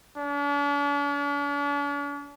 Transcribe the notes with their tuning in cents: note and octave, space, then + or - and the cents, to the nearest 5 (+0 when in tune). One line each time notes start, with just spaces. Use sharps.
D4 -45